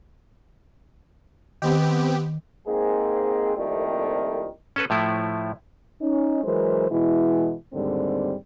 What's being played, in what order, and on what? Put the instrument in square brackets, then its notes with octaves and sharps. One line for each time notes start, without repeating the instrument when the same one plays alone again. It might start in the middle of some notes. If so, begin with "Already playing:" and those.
[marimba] D#3 [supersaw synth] B3 C4 G4
[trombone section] G#2 G#3 A#3 C4 G#4
C2 F2 A#2 D#3 G3 A3
[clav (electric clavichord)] C#4 A4 B4
A2 F3 A3 E4
[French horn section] C#4 D#4
E3 F#3 G#3 A#4 C5
B2 E3 G#3 E4
D#2 G#2 D3 G3 C4